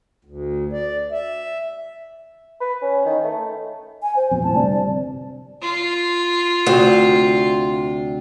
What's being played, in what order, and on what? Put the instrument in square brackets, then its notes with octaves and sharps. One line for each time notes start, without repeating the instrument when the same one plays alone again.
[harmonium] D2
D5
E5
[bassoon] B4
C#4
D#3
A3
[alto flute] G#5
C5
[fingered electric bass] F2 B2
[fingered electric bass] A2 [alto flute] A5
[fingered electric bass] G1 G2 C3 [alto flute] D5
[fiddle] F4
[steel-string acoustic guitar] D2 C3